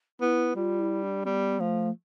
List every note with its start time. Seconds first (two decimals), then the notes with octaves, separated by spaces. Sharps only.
0.20 B3 E4
0.55 G3 F4
0.79 E4
1.03 D4
1.25 G3 B3
1.59 F3 A3